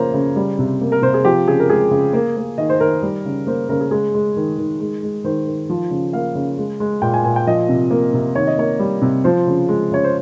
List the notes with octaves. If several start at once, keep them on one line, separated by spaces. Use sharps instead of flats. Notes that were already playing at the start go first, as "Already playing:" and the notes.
Already playing: C#3 F3 A#3 C5 C#5 F5 A#5
C#3
G3
C3
A#3
A#4
C3 C5
G#4
F3 G4
C#3 G#4
A#4
G#3 G#4
C#3
A#3
A#3
D#3 D#5
C5
D#3 A#4
G3
C#3
A#3 C5
C#3 A#4
G#4
G#3 G#4
G#3
D#3
D#3
G#3
G#3
D#3 C5
D#3
F3
C#3
A#3 F5
C#3
G#3
G#3
A#2 G5
G#5
A#2 G#5
G5
F3 D#5
C3
A#3
C3
D#3 C#5
D#5
A#3 C#5
G3
C3
F3 C5
C#3
G#3
C#3 C#5
C5